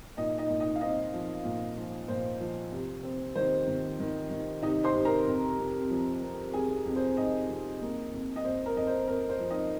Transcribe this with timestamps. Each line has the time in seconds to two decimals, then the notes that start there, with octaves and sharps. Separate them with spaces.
0.17 A#2 D#4 D#5
0.38 D#4 D#5
0.50 A#2
0.60 D#4 D#5
0.76 F5
0.81 C4 D#4 D#5
1.14 F3
1.45 A#2
1.77 F3
2.08 A#2 C5
2.40 F3
2.72 C3
3.03 C4
3.35 D#3 C5
3.67 D#3
4.00 D#3
4.31 D#3
4.62 C3 D#4 D#5
4.84 C5 C6
4.94 C3
5.05 A#4 A#5
5.26 F2
5.59 F2
5.90 F3
6.22 C4
6.53 F2 G#4 G#5
6.86 F2
6.96 C5
7.17 F2 D#4 D#5
7.49 F2
7.82 A#3
8.13 F2
8.36 D#5
8.44 F2 C5
8.66 A#4
8.76 F2 D#5
8.87 C5
9.08 F2 A#4
9.30 C5
9.40 F3
9.50 D#4 D#5